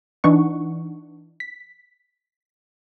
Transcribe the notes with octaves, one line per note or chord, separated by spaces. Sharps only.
E3 D4 D#4 F#5 C#6
B6